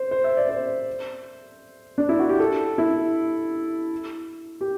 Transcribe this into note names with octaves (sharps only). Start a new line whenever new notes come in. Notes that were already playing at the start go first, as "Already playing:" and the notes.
Already playing: C5
C5
E5
D5
C5
D4
E4
F#4
G4
A4
E4
G4